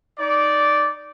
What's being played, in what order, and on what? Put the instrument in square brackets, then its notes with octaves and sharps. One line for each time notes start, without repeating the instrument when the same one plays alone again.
[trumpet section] D#4 D5